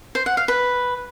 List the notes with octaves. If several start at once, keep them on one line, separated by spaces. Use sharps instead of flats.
C5
F#5
F5
B4